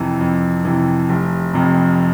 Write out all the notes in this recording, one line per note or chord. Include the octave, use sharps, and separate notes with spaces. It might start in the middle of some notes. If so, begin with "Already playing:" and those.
Already playing: F2 C3 E3
F2
C3 E3
F1
F2 C3